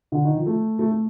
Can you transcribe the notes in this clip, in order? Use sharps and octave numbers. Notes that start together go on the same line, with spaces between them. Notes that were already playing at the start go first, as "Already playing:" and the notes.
D3
D#3
F3
A3
A3
A3